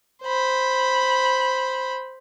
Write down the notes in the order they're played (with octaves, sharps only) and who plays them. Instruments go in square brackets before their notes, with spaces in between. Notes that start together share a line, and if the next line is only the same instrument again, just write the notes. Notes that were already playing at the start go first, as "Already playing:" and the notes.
[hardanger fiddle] C5 B5